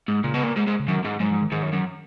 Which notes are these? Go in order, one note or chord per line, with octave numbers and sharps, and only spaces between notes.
G#2
A#2 C#3
B2
A#2
G#2
G#2
C#3
F#2 D#3
G#2
G#2 F#3
F3
D#3
G#2 D#3
F#2
F#2